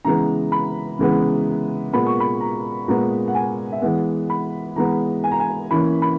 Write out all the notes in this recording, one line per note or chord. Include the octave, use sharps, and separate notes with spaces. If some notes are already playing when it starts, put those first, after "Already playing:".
C#3 E3 G#3 B3 A#5
B5
C#3 E3 G#3 B3
A#2 G#3 B3 B5
C#6
B5
A#5
A#2 G#3 B3 A#5
F#5
G#5
E5
E3 G#3 B3 F#5
B5
E3 G#3 B3 A#5
G#5
A#5
G#5
E3 A#3 C#4 B5
B5